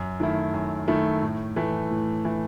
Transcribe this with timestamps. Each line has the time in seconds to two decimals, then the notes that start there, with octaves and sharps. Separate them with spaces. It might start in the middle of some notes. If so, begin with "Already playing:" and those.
Already playing: F#2
0.20 D#3 A3 E4
0.54 F#2
0.88 D#3 A3 E4
1.22 A2
1.56 E3 A3
1.91 A2
2.25 E3 A3